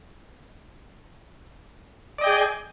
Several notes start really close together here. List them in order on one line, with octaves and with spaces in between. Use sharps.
D5 D#5 G5 G#4